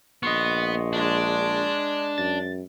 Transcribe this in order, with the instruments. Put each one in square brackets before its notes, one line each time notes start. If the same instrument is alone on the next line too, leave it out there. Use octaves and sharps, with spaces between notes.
[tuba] A#1 [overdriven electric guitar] B3 [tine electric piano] D#5 C6 C#6
[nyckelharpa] G#3 D5 [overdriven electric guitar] D4
[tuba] F#2 [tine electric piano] A6